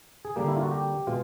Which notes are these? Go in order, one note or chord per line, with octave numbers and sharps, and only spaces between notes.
G#4
D3 G3 A#3 G4
E4
F4
F#4
G4
B2 G#3 F4